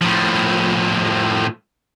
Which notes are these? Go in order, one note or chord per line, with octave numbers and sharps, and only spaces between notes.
A2 F3